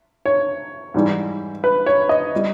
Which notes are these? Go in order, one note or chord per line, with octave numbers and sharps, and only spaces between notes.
C#5
G#2 E3 G3
B4
C#5
D#5
G3